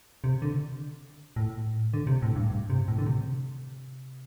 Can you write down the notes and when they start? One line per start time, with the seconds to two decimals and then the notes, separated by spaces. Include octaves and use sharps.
0.24 C3
0.42 D3
1.36 A2
1.93 D3
2.07 C3
2.22 A2
2.36 G2
2.50 G2
2.70 C3
2.88 A2
2.99 D3
3.06 C3